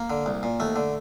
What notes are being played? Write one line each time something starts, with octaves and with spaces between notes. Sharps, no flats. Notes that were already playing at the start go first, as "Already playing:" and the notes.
Already playing: A#3
D3
C2
A#2
D#2 A3
D3